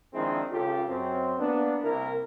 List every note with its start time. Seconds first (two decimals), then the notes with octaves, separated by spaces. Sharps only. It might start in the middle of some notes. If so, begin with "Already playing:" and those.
0.14 D#3 F3 G#3 C4 D4 E4
0.52 C#2 C#3 F4 G4 A4
0.89 F#2 C4
1.39 A#3 B3 D4
1.83 C2 C3 A#3 E4 A#4